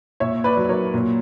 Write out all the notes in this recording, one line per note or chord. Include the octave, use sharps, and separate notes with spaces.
A#2 C#5 E5
B4 D5
F#3
A#4 C#5
A#2